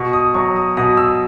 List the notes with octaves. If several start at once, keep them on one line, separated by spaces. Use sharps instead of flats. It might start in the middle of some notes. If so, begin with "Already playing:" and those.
Already playing: B2 C#6
D#6
F#3 C#6
D#6
B2 D#6
E6